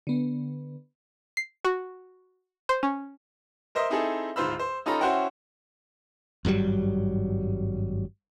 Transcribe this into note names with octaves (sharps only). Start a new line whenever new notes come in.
D3 B3
C7
F#4
C5
C#4
A#4 C5 D#5 E5
C4 D#4 E4 G#4 A4
D1 G#2 F4 C5 B5 E6
C5
C#4 D#4 F4 A4 A#5 B5
C#4 E4 F#4 C5 F#5 G5
G#1 G2 F#3 G3